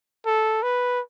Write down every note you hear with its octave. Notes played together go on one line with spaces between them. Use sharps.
A4
B4